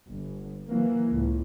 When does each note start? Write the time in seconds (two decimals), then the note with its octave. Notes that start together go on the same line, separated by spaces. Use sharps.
0.10 G1
0.68 E3 F#3 A#3
1.10 C#2 A2